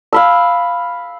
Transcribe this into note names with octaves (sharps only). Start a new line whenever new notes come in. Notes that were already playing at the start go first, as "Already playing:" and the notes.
F5 B5 E6